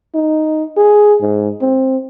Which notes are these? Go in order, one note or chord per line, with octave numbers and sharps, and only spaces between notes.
D#4
G#4
G#2
C4